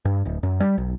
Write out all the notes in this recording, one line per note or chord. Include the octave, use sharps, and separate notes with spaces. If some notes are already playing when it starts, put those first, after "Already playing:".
G2
D1
F#2
G3
B1